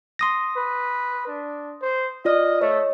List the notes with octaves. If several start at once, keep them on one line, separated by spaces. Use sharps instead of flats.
C6 D#6 A#6
B4
D4
C5
F4 D5 D#5 F6
A3 C#5 D#5